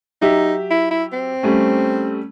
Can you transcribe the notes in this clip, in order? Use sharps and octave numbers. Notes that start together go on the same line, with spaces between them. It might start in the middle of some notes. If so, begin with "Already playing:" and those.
F#3 D#4 G4 E5
E4
E4
C4
G3 A3 C#4